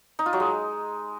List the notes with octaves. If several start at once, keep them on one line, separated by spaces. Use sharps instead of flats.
D#4
F4
F#3
G#3